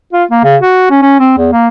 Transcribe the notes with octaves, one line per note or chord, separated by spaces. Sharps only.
F4
A#3
C#3
F#4
C#4
C#4
C4
E2
A#3